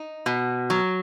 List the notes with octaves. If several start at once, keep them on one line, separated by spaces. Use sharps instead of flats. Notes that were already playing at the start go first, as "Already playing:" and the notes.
Already playing: D#4
B2
F#3